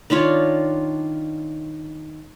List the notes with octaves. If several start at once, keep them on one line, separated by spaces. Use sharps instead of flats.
D#3 D4 F4 C#5